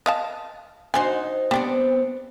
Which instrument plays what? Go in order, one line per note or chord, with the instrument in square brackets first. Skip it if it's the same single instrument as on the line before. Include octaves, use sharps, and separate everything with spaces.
[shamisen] D#5 F5 A5
[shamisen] D4 G#5 [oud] D#4 F#4 C5
[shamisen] G3 D4 [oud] B3 C4